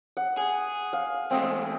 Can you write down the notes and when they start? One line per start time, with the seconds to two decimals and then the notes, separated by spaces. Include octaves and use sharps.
0.17 F#5
0.37 G#4
0.93 F5
1.31 E2 G#3 A3 C4 D#5